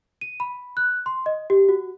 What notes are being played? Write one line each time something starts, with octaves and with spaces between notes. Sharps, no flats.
D#7
B5
F#6
C6
D#5
G4
F#4